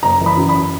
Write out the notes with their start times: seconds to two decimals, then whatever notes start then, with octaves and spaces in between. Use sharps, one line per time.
0.03 F#1 A#5
0.21 E3
0.26 B5
0.37 F#2
0.49 B5